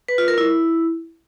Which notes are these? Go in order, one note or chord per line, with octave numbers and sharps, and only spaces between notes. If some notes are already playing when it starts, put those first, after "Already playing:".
B4
F4
A#4
E4